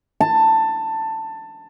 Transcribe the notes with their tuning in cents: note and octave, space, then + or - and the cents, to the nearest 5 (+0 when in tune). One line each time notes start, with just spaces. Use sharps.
A5 +15